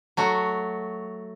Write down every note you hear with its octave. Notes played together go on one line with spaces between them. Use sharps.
F#3 A3 F#4